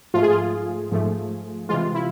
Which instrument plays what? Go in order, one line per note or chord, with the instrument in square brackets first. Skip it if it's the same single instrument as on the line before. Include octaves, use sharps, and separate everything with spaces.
[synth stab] G#2 F3 A3 F4
G#4
F4
G#2 F3 A3
C3 E3 G#3 F4
E4